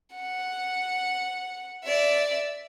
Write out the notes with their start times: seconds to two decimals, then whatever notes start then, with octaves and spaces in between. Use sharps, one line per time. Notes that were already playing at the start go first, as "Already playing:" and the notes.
0.15 F#5
1.84 D5 E5